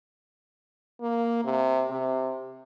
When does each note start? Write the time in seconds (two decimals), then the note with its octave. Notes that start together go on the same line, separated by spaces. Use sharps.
1.01 A#3
1.44 C3
1.90 C3